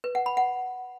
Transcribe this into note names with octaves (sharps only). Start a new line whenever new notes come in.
B4
F#5
B5
F#5